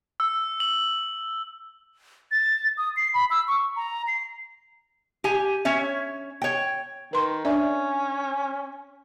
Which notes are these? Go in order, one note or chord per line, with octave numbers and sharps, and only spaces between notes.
E6
F#7
A6
D#6
C7
B5
E6
C#6
A#5
C7
G4 G#5
C#4 C#5 E5
C#5 G5
D#3 B4 C6
C#4 D4 D5 E5